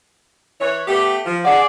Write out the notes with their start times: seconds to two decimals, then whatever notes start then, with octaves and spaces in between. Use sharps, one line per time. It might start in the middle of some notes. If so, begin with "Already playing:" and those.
0.61 E3 B4 C#5
0.88 A3 B3 G4
1.25 F3
1.45 G#4 D5 F#5